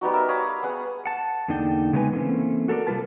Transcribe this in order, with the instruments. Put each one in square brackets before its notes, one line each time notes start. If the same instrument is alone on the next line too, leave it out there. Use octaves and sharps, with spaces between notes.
[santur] G3 B3 D#4 F#4
A#4 E5
C#5 F5 B5 D#6
B3 G#4 F#5
[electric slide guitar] F#5 A5
E2 D3 A#3 D#4 D5 G5
C#3 G#3 B3 D#4 B4 G#5
E3 A3 A#3 C4 C#4
F#4 A4 A#4 C5 D5
C3 G3 D#4 F4 B4 A5